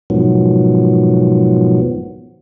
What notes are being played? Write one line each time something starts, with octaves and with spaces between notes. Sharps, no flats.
G#2 B2 D#3 F3 F#3 B3